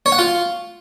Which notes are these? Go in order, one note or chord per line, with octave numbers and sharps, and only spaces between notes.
C#5
F#5
F4